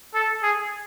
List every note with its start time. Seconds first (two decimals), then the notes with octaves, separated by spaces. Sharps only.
0.14 A4
0.43 G#4